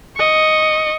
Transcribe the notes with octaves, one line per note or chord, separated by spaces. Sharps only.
D#5 C#6